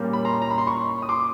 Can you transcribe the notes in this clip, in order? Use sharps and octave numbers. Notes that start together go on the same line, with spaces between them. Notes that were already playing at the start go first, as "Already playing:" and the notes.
Already playing: A#2 G3 A#3 C#4
B5
A#5 C6
A#5
B5
C6
B5 C#6
D#6
C6 D6